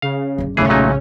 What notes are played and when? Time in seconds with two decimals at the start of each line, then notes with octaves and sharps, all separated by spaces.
0.02 C#3 F5
0.38 F#1 D3
0.57 B1 G#2 C#3 E3 A3 C#4 G#4
0.69 A#2 F#3 D#4